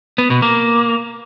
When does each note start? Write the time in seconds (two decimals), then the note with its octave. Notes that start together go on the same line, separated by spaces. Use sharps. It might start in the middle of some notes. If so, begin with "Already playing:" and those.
0.18 B3
0.30 B2
0.42 A#3